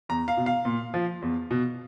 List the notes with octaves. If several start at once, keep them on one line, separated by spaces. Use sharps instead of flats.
E2 A#5
F5
B2
F5
A#2
F3
E2
B2